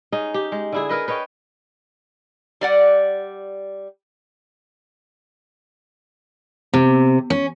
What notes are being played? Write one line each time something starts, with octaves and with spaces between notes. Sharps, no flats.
C#4 D#4 G#4
G4
G#3
D3 E4 G#4
G#4 A#4 B4 D#5
B4 C#5 D#5 G5
G3 D5 F#5
C3
C#4